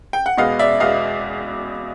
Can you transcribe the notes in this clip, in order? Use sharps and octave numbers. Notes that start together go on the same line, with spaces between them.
G5
F#5
E2 B2 G#3 B3 D#5 F5
D5 E5
E2 B2 G#3 B3 D#5 F5